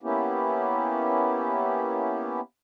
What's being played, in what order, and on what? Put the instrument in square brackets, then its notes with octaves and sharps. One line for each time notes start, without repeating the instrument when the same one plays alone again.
[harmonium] A#3 B3 C#4 E4 G4